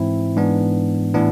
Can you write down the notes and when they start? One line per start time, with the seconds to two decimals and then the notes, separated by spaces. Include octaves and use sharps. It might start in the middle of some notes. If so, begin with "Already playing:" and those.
Already playing: G#2 E3 C4 E4
0.37 G#2 E3 B3 D4
1.14 A2 E3 B3 D4